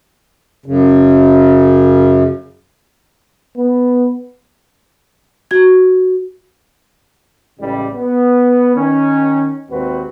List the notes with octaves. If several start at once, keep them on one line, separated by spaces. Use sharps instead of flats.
F#2 C#3
B3
F#4 G#6
A1 A2 C#3 G3 G#3
B3
D#3 C#4
D#2 G#2 C4 F#4 B4